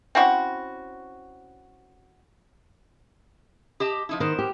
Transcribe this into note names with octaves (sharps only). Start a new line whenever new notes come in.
C4 C#4 E4 F#4
G4 D#5 A5
F3 D#4 E4
D#3 B3 A#4 C5
G4